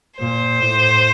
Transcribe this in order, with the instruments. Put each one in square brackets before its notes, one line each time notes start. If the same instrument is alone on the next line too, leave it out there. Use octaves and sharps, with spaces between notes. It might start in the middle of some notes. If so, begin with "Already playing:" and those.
[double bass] A#2 [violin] C5
[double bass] A2